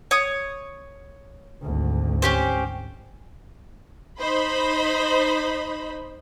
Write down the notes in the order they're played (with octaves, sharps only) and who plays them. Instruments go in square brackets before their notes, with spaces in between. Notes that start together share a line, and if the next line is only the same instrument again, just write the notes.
[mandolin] C#5 D#6
[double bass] G#1 D2
[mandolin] C#4 G4 C5
[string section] D#4 C5 B5